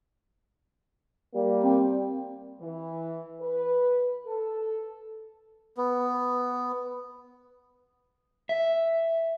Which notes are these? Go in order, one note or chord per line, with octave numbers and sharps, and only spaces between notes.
G3 A#3
C4
E3
B4
A4
B3
E5